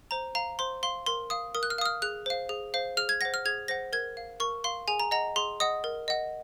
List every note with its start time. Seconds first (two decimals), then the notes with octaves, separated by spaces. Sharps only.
0.11 C5 A#5
0.35 F5 A#5
0.59 C5 C6
0.83 F5 C6
1.06 A#4 C6
1.30 F5 D#6
1.55 A#4 D#6
1.63 F#6
1.70 F6
1.78 F5 D#6
1.86 F6
2.02 G#4 F#6
2.26 C5 F5
2.49 G#4
2.74 C5 F5
2.97 G#4 F6
3.09 G#6
3.21 C5 F#5 A#6
3.34 F6
3.45 G#4 G#6
3.68 C5 F#5 A#6
3.93 A#4 G#6
4.17 F5
4.40 A#4 C#6
4.64 F5 C6
4.88 G#4 G#5
5.00 A#5
5.11 D#5 F#5 A#5
5.36 G#4 C6
5.60 D#5 F#5 D#6
5.84 A#4
6.08 D#5 F#5